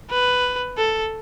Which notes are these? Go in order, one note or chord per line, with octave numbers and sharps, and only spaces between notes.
B4
A4